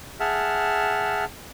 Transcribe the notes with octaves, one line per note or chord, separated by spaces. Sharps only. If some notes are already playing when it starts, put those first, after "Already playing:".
G#4 E5 F#5 A5 F6